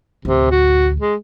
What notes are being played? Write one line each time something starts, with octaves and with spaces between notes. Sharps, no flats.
A1 D2 C3
F#4
G#3